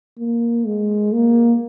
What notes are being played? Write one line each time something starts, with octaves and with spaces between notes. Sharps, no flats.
A#3
G#3
A#3